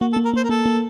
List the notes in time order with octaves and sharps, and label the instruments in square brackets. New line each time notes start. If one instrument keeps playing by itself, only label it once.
[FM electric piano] A#3 [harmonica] F#4
[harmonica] A4
[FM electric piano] A#3
[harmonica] A#4
[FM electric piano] A#3 [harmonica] C5
[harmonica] A#4
[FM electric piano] A#3 [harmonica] A4
[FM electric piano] A#3